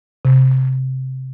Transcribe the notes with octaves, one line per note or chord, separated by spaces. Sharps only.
C3